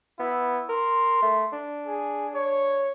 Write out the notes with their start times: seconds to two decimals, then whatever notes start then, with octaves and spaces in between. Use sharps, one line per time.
0.20 B3 E4
0.69 A#4 C6
1.22 A3
1.53 D4
1.86 G#4
2.35 C#5